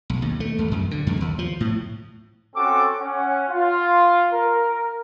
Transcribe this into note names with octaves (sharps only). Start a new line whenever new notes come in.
B1
D#2
A3
D#2
F#2
D3
F2
D#2
F3
A2
C4 C#4 F#4 A4 D6
C#4 F#5
F4
A#4